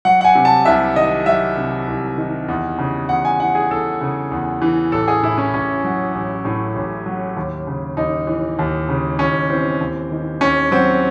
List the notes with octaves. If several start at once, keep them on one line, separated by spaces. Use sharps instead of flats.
F#3 F#5
F#5
G#5
C3
A5
C2 E5
D#3 D#5
F#3 E5
C3
C2
D#3
E2
C#3
E2 F#5
G#5
E3 F#5
G#4
E2 A4
C#3
E2
E3
A1 A4
G#4
A2 E4
C#4
A1 C#4
F#3
A1
A2
A1
F#3
D#2
C#3
D#2 D#4
E3
D#2
C#3
D#2 C#4
E3 C4
D#2
D#3
D#2 C#4
F#3 C4